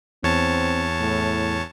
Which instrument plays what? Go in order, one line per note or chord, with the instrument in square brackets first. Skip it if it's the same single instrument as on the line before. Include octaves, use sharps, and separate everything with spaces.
[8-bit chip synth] E2 C#5 A5 [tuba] C4
[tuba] A2